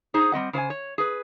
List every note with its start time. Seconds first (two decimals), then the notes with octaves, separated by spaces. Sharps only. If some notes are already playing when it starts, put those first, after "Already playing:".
0.14 D#4 G#4 C5
0.32 G3 C4 D#5 F#5
0.53 C#3 C5 D5 G#5
0.70 C#5
0.98 G#4 B4